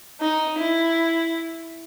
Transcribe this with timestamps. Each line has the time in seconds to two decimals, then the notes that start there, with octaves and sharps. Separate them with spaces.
0.21 D#4
0.58 E4